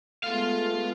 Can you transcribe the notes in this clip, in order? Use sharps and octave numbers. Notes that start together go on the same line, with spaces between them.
G#3 A3 B3 F4 F5